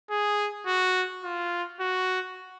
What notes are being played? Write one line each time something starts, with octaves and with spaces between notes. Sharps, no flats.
G#4
F#4
F4
F#4